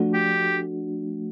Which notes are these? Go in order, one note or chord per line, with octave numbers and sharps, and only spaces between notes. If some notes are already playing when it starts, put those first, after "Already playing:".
Already playing: F3 A3 D4 F#4
G4